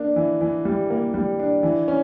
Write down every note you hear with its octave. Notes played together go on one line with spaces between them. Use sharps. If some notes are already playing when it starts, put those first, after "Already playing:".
Already playing: A#3 D4
E3
E3
G3
A#3
G3
D4
E3
C#4